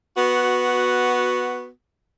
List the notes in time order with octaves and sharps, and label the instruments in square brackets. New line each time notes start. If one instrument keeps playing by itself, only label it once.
[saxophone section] B3 F#4